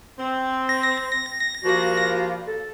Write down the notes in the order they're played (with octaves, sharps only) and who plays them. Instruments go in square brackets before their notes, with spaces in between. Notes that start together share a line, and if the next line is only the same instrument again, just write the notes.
[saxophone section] C4
[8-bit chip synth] A#6
[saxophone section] F3 G3 A#3 [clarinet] F#4
[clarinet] A4